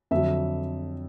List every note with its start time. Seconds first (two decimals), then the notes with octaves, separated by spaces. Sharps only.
0.11 F2 D3 F#3 E5